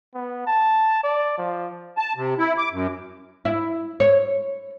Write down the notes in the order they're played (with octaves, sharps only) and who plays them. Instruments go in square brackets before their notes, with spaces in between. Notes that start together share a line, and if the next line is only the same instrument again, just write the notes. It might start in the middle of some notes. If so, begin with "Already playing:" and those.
[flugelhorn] B3
A5
D5
F3
[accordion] A5
C3
E4
D6
F#2
[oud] E4
C#5